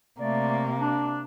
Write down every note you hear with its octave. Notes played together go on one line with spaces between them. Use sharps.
C3 A3 A#3 D5
D4